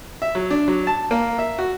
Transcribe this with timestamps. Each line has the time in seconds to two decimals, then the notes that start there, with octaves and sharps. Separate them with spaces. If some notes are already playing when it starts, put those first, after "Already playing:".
0.22 E5
0.35 F#3
0.51 D4
0.68 F#3
0.87 A5
1.11 A#3
1.38 E5
1.59 F#4